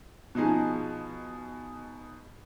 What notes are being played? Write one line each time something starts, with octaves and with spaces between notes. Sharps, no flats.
B2 F3 D#4 G#4